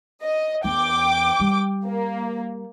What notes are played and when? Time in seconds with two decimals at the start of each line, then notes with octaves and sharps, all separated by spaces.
0.21 D#5
0.64 E2 G5 D6
1.40 G3
1.85 A#3